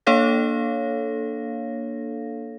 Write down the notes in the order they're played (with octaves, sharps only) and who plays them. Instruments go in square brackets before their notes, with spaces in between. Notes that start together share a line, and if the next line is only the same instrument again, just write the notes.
[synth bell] A#3 D4 A4 C#5 F5 A#6